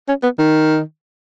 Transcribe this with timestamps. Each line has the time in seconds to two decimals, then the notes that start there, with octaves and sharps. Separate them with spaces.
0.08 C#4
0.23 B3
0.39 D#3